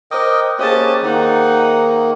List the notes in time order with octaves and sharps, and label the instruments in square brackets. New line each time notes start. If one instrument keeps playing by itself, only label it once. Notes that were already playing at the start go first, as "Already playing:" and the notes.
[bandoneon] A#4 D#5 G5 [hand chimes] C5 D6 D#6
[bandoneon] A#3 C#4 G4 [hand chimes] G#4 C5 [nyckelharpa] D#5 A5
[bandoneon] D#3 A#3 [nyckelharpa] D#4 F#5